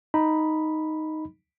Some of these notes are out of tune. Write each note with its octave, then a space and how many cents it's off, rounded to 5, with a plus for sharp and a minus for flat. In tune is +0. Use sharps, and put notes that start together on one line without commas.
D#4 +0 B5 +0